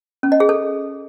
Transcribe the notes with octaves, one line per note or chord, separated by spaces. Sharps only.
C#4
D#5
G#4
A4